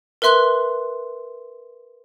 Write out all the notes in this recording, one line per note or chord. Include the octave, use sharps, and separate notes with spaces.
A#4 B4 E5 C6 F#6 G7